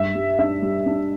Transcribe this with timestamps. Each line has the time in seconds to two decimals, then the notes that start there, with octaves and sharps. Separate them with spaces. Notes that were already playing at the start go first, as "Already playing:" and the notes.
Already playing: G2 E5
0.15 G3
0.39 D4 E5
0.62 G3
0.86 D4